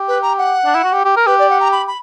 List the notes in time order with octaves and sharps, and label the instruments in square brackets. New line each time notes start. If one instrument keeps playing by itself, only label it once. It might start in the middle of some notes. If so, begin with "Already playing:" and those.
Already playing: [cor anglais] G4
[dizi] B4
A#5
F#5
[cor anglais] D4
E4
F#4
G4
G4
A#4
[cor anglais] G4 [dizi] B4
[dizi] D5
F#5
A#5
B5
B5